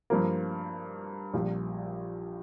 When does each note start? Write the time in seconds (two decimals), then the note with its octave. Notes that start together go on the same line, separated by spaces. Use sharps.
0.10 G2 F3 A#3
1.33 A#1 A#2 G3